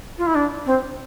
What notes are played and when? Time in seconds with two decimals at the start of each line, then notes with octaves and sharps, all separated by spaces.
0.18 F4
0.27 E4
0.35 D4
0.66 C4